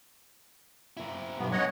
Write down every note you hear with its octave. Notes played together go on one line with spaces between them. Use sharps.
A#3 E4
B1 G2 C3 B3
G3 C#4 C#5 D#5 F#5